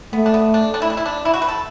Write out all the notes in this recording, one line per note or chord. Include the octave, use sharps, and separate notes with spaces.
A3 B3
D4
B3
D4
D4
E4
D4
E4
D4
E4
F#4
B4
A4